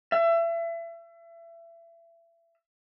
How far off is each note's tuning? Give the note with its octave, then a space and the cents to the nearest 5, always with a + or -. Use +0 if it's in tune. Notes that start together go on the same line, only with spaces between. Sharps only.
E5 +30